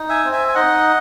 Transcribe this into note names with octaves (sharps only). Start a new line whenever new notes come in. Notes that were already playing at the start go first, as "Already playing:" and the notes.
Already playing: D#4
E5 G#5
C4
E5 G#5
G#5
D#4 D#5 F#5